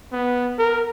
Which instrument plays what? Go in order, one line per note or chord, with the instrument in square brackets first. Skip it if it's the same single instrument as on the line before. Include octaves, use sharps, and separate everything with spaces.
[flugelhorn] B3
A#4